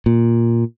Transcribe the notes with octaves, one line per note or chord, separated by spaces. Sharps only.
A#2